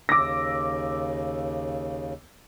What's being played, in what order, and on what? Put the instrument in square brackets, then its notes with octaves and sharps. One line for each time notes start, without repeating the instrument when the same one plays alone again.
[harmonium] D#2 C#3 [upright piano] D6 E6 A#6